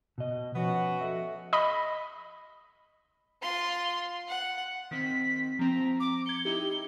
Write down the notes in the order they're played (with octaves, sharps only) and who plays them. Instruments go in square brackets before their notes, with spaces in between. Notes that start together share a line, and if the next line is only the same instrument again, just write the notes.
[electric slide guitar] B2 D#5
[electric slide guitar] F3 [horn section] B3 C#4 F#4
[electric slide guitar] A4 D#5 E5
[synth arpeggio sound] D#5 B5
[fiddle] F4 C6
F#5
[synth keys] D#3 C4 [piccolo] B6
[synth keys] F3 C4 [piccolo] A#5
[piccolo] D6
[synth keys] G#6 C#7 [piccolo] G7
[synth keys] D#4 E4 G4